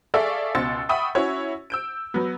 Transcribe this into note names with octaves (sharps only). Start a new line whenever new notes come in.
G#4 A4 D5 E5 F5 C#6
C#2 B2 C6 E6 A6 C#7
E5 F#5 G5 B5 C#6 D#6
C#4 E4 F#4 C#5
E6 G6 D7
F#3 B3